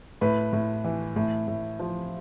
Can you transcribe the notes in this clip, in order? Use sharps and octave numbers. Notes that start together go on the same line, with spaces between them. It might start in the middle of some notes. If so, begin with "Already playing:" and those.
A2 B4
A2
E3
A2
A2
F3